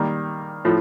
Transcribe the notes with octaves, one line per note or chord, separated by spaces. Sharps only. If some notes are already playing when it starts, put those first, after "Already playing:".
Already playing: D#3 G3 A#3
A2 F3